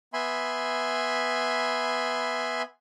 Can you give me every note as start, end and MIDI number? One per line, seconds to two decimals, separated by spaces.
0.13 2.62 59
0.13 2.62 76
0.13 2.62 80
0.13 2.62 83
0.13 2.62 84